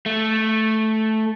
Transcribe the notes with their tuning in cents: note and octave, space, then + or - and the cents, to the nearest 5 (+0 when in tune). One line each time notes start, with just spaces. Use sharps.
A3 -5